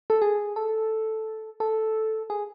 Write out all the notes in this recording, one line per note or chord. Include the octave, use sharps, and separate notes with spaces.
A4
G#4
A4
A4
G#4